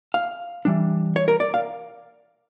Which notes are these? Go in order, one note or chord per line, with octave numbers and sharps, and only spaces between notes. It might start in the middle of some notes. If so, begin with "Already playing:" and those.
F5
E3 G3 D4
C#5
A#4
D5
F5